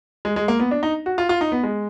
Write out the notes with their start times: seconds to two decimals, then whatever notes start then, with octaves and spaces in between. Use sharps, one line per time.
0.25 G#3
0.36 G#3
0.48 A#3
0.60 B3
0.71 D4
0.83 D#4
1.06 F#4
1.18 F4
1.29 F4
1.41 D#4
1.52 B3
1.63 G#3